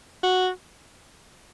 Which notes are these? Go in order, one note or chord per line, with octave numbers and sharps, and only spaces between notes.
F#4